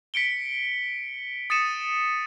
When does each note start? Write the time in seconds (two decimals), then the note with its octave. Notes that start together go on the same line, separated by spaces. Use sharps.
0.14 B6 C#7 D7 G7
1.50 D#6 A6 C#7 D#7 E7